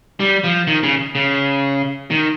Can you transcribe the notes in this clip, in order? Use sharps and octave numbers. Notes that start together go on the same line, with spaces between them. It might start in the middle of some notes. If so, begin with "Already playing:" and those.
G3
F3
D#3
C#3
C#3
D#3